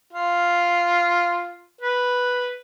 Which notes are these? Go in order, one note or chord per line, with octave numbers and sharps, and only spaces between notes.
F4
B4